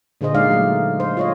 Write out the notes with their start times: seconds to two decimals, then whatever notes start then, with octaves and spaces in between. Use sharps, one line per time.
0.21 A#2 D3 A#3 G#4 C5 D#5
0.35 G#3 D#4 D5 F5
0.50 F#3 G#3 A3
1.00 C5
1.17 F4 C#5 D#5